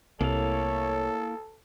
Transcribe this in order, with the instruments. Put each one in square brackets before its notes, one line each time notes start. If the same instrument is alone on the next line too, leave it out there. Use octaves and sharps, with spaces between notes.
[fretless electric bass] C2 [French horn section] A3 C#5 [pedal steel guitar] A#3 E4 F5 [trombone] A4